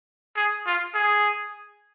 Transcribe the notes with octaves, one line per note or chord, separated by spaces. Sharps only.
G#4
F4
G#4